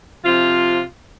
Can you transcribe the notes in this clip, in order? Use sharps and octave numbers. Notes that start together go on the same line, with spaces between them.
C3 F3 F4